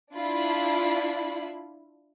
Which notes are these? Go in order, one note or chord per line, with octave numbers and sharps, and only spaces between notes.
D4 E4 F4 B5